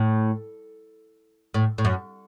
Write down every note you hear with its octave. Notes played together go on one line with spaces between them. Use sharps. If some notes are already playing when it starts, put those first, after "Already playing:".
Already playing: A2
A2
A2
F#2